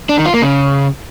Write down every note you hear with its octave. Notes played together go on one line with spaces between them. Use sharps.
D4
D#3
F4
A#3
C#3